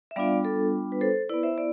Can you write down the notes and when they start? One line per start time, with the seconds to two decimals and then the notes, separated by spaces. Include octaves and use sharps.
0.11 E5
0.16 G3 B3 D4 F4 D5 F5
0.45 A4
0.92 B4
1.01 A4 C5
1.29 B3 E4 B4 D5
1.43 C5 E5
1.58 D5